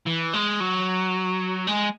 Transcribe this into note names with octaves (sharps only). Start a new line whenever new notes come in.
E3
G#3
F#3
G#3